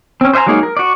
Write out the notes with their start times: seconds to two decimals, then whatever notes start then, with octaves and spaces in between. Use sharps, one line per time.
0.21 C4 C#4
0.33 C5 D#5 E5 G#5 A#5
0.46 F#3 G#3 A#3 D#4 G#4
0.63 A#4
0.77 F#4 D5